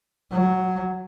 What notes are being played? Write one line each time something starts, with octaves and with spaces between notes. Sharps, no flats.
F#3